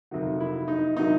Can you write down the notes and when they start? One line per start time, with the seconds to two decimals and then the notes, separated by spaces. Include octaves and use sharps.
0.11 F2 C3 D#3 F#3
0.40 E4
0.68 D#4
0.96 C3 D#3 F#3 D#4